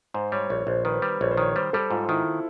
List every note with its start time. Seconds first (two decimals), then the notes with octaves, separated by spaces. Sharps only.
0.14 G#2 C5
0.32 G3 C#5
0.49 A#1 C#5
0.67 A#1 C5
0.85 D#3 B4
1.02 G3
1.21 A#1 C#5
1.31 C5
1.37 D#3 C#5
1.56 G3 C5
1.73 G3 A4
1.91 G#2 F4
2.09 D#3 E4